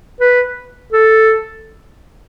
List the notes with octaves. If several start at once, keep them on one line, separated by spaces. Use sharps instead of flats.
B4
A4